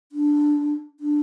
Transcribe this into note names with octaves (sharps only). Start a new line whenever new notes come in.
D4
D4